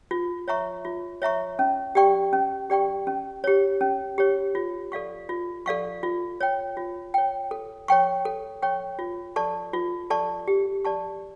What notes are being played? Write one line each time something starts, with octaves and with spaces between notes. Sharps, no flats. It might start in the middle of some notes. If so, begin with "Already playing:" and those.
F4
C#5 E5 A#5 C#6
F4
C#5 E5 A#5 C#6
C#4
G4 D5 G5 C#6
C#4
G4 D5 G5 C#6
C#4
G4 C#5
C#4
G4 C#5
F4
A4 D5 F5 C#6
F4
A4 D5 F5 C#6
F4
C#5 G5
F4
C#5 G5
A4
C#5 G5 C#6
A4
C#5 G5 C#6
F4
A4 D5 A5 C#6
F4
A4 D5 A5 C#6
G4
D5 A5 C#6